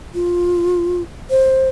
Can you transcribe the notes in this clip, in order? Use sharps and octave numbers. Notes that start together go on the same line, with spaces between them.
F4
C5